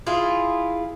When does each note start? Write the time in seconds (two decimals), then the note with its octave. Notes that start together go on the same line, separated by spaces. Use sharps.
0.07 E4 F4 G#4